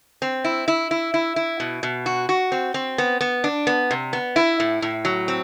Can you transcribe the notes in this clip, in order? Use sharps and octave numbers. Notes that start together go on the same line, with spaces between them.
C4
E4
E4
E4
E4
E4
B2
B2
F#4
F#4
C4
C4
B3
B3
D4
B3
C3
B3
E4
A2
A2
F#3
C4